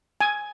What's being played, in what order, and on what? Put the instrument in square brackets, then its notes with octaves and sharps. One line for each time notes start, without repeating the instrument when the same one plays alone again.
[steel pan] G#5